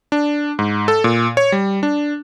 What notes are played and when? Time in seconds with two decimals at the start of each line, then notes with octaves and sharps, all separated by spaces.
0.12 D4
0.59 G#2
0.88 A4
1.04 A#2
1.37 C#5
1.52 G3
1.83 D4